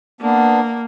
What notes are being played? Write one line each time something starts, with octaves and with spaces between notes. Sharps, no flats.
A#3 B3 D4